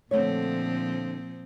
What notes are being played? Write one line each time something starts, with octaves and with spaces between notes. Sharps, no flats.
A#2 D3 F3 A3 C4 C#5